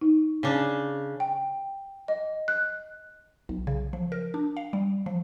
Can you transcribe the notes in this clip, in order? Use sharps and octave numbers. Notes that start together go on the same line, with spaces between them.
D#4
C#3 D4
G5
D#5
F#6
B1
C#3
F3
A#4
D4
F5
G3
F3